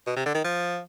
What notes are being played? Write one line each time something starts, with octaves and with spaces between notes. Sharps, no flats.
B2
C3
D3
D#3
F3